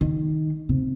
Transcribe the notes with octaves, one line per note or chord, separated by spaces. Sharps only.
D#3
C3